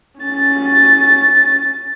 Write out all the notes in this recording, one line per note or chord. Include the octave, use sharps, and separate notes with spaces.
C#4 A6